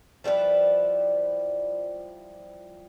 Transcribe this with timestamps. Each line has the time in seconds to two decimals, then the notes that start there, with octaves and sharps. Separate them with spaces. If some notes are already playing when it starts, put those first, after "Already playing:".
0.24 F3 G3 E4 B4